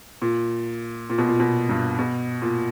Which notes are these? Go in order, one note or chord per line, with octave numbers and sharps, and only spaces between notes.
A#2
A#2
B2
A#2
B2
G2
B2
A#2